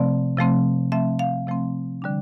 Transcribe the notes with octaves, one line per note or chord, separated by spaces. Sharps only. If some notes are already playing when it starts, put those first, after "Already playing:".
Already playing: C3 F3 A3 C4 D5
C3 F3 A3 C4
C3 F3 A3 C4 E5
F5
C3 F3 A3 C4
D3 G3 D4